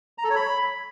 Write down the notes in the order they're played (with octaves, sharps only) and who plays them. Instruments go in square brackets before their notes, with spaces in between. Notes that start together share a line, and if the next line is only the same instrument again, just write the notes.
[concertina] A#5
A4
C#5
B5